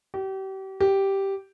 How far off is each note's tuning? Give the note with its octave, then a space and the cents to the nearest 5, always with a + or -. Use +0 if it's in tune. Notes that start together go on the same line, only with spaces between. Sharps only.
G4 -35
G4 -5